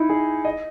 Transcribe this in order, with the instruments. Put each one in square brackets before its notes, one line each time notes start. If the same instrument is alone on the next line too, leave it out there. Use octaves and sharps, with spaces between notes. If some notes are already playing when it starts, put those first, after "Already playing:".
Already playing: [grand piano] D#4 E4
G#4
D#5